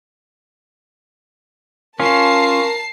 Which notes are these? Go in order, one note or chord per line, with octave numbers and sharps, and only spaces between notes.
C#4 F4 A#4 A5 C7